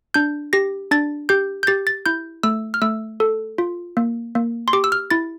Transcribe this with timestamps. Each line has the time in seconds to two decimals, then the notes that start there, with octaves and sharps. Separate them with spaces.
0.14 D4 G6
0.53 G4 A#6
0.91 D4 A6
1.29 G4 G6
1.63 G6
1.67 G4 A6
1.87 A6
2.06 E4 G6
2.43 A3 E6
2.74 F6
2.82 A3 E6
3.20 A4
3.58 F4
3.97 A#3
4.35 A#3
4.68 C6
4.73 G4 D6
4.84 E6
4.92 F6
5.11 E4 A6